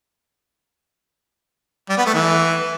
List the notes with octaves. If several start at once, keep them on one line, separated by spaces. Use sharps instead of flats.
G3
B3
A3
E3